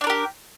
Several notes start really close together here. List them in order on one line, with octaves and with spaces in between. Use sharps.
D4 D5 A#4 G4